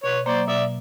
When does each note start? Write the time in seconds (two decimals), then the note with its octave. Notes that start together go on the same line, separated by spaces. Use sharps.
0.04 B2 B4 C#5
0.25 F#3 A#3 C5 D5
0.48 B2 D5 E5